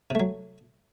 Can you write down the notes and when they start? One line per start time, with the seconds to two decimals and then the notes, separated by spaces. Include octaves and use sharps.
0.10 C3
0.15 A3
0.20 F#3